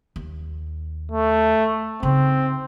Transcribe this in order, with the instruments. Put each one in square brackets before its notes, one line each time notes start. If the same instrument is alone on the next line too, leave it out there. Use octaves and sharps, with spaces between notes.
[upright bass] D#2
[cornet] A3
[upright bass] C#3 D#4 [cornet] C4